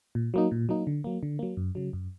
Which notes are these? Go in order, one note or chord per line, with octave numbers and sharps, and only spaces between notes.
A#2
F#3 A#3 D#4
A#2
F#3 A#3 D#4
D3
F#3 A#3
D3
F#3 A#3
F#2
C#3 F#3
F#2